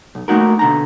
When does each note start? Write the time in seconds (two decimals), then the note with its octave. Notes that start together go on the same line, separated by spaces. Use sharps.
0.15 B1
0.28 A3 A#3 D#4 F#4 A#4
0.59 B2 D3 A#5